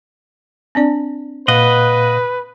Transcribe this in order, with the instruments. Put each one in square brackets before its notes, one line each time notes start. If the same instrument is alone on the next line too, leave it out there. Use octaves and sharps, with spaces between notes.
[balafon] C4 D4 D5
[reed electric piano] A#2 F5 [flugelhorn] B4 [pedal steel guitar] D#5 F#5